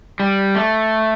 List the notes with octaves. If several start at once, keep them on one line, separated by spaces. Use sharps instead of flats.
G3
A3